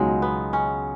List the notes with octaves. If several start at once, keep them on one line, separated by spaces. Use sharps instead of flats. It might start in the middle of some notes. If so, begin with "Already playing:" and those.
Already playing: C#2 B2 F#3 G#3 D#4
B3
C#4